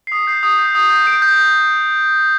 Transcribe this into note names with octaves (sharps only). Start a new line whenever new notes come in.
C7
D#6 B6
G6 C7
D#6
G6
D#6
G6
D#6 D7
G6